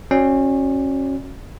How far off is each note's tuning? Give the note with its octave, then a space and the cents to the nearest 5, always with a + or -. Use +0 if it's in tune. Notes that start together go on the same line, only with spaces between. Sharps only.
C#4 -25 F#4 -5 D5 +0